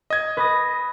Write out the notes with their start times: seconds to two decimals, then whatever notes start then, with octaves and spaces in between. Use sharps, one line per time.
0.10 D#5 G#6
0.37 B4 D#6 A#6